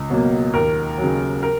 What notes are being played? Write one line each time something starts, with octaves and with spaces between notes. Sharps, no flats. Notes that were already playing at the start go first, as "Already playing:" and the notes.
Already playing: C#2
B2 F#3 A#3
D#2 A#4
F#3
C#3
A#4